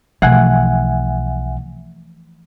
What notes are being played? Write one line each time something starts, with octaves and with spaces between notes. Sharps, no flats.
B1 E3 F3 A3 E5 F#5 G#5